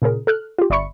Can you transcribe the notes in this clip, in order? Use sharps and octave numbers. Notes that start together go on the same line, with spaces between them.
A#2 C#3 G#4 A#4
A4 F6 F#6
F4 G4
G1 D5 E5 B5 C#6 C#7